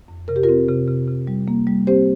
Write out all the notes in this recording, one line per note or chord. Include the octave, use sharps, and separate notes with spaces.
F2
C3 A#4
G4
F4 A#4
C4
C3
C3
C3
G3
A#3
G3
C4 G4 C5